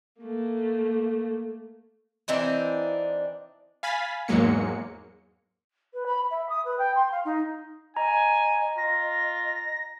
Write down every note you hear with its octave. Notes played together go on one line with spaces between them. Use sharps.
A3 A#3
E3 C4 D4 D#4
F5 G#5 B5 A6 B6
E2 G#2 F#3 G#3 A#3 C#7
B4
B5
E5
D#6
B4
G5
C6
F5
D#4
D#5 G#5 A#5
F4 A#6